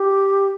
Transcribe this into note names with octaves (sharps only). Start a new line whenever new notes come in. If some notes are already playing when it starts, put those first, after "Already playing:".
Already playing: G4